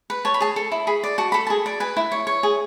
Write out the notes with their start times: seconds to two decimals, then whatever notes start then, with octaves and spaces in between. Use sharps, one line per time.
0.10 B4
0.25 C#5 A5
0.34 B5
0.41 G#4 A5
0.56 A4
0.72 E4
0.87 G#4 B5
1.04 D5
1.18 F#4 A5
1.32 A4 B5
1.47 G#4 A5
1.66 D5
1.80 B4 G#5
1.97 E4
2.12 C#5
2.27 C#5
2.43 G#4